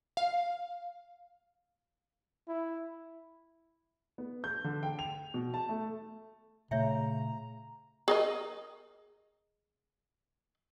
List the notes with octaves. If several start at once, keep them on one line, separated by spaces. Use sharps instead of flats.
F5
E4
B3
G6
D3
G5
F7
B2
A5
A3
A#2 C#3 A3 C#5 E5 G5 A#5
G#4 A#4 D#5